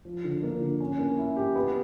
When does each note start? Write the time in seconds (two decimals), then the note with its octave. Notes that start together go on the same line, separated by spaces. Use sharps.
0.05 F3
0.24 D3
0.43 A#3
0.61 D3
0.80 C#4
0.99 A#3
1.18 E4
1.37 G4
1.56 B3